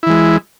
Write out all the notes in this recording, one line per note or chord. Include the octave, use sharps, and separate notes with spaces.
E3 G#3 E4